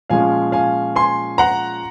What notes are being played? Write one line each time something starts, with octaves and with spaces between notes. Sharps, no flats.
A#2 F3 G#3 C#4 F5 G#5
F5 G#5
G#5 C6
F#5 A#5